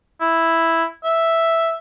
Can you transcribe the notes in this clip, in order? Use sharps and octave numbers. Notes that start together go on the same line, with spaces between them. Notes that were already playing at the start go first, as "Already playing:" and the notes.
E4
E5